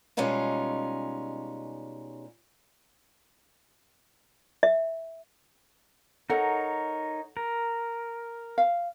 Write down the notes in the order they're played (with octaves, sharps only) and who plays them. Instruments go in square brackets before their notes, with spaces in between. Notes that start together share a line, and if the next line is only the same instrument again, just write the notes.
[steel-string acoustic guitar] B2 G3 G#3 C#4 D#4 F4
[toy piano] E5
[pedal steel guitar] D#4 A#4 C#5 [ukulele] A4 F#5
[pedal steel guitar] A#4
[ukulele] F5